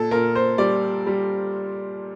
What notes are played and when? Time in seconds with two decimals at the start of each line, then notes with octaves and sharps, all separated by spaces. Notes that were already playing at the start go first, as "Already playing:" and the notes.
Already playing: A#2 A4
0.11 A#2 A#4
0.35 C5
0.58 G3 D5
1.07 G3